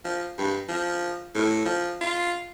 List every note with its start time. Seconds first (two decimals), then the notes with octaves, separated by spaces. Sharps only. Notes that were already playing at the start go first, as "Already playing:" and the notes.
0.04 F3
0.38 G2
0.69 F3
1.35 A2
1.65 F3
2.01 F4